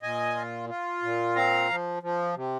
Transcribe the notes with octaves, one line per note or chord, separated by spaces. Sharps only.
A#2 D#5 G#5
F4
F4
A#2
C4 F5 A#5
F3
F3
C3